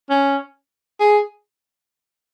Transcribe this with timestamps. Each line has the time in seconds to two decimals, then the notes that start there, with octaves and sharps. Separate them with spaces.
0.10 C#4
1.00 G#4